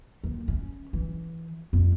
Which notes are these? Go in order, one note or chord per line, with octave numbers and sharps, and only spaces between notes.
D#2
C#4
E3
F2